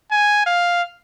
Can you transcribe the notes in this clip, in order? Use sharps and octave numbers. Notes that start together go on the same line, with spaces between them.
G#5
F5